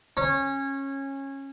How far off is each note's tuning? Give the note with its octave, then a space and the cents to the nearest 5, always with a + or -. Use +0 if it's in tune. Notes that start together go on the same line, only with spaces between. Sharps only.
C#4 -20